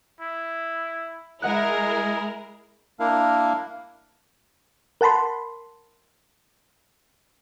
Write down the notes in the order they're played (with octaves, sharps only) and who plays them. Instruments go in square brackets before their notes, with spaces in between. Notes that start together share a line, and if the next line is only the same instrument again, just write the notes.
[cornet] E4
[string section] G#3 E4 A#4 [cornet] G#4 [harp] D#5 F#5 F#6
[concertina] A#3 D4 E4 A#4 F5
[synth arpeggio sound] A#4 F#5 A5 B5 C6